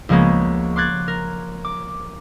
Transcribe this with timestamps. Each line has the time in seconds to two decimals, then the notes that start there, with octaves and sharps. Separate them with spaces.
0.09 C#2 F3 G#3 A#3 B3 C#4
0.76 C6 D6 F#6 G#6 A6
1.08 A#4
1.65 D6